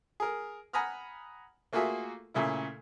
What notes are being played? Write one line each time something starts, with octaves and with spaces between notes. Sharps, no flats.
G#4 A#4
F#5 G#5 A#5 B5 D#6 F6
A3 A#3 F4 F#4 G#4 E5
A#2 C#3 A3 E4